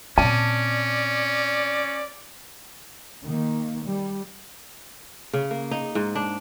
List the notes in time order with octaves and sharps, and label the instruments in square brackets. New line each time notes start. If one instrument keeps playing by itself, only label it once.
[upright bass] A#2 C4 [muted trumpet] C#4 [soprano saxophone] D5 [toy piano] A5
[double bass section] D#3 A#3
G3
[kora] C#3
A#3
D#4
G#2
D4